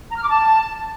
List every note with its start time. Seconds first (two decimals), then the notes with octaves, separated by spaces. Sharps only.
0.10 A#5
0.16 F6
0.23 D6
0.30 A5